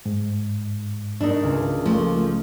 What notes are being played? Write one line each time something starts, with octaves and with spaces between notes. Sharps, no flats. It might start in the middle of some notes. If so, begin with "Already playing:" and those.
G#2
A3 D4 D#4 A#4
C#2
F3 A3 A#3